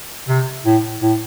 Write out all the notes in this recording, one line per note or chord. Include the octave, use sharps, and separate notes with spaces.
C3
A2
A2